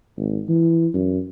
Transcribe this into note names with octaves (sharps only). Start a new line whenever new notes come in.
G#1
E3
F#2